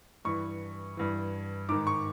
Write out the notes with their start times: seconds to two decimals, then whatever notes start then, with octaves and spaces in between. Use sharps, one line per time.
0.25 G2 E3 C#6
0.97 G2 E3
1.69 G#2 D#3 D6
1.87 C#6